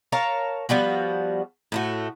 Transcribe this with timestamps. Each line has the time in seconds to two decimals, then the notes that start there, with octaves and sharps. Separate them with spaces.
0.12 A#4 C#5 F5 A5
0.69 F3 G3 B3 F#4
1.72 A2 A3 F#4